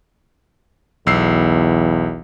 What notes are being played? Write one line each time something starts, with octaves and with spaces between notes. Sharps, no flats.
B1 E2 E6 C7